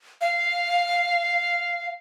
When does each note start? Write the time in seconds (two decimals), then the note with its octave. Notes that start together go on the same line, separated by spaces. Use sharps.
0.21 F5